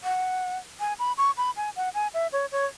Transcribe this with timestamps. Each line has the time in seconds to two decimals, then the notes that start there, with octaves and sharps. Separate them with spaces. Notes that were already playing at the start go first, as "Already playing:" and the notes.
0.04 F#5
0.80 G#5
0.99 B5
1.18 C#6
1.37 B5
1.57 G#5
1.76 F#5
1.94 G#5
2.14 E5
2.33 C#5
2.52 C#5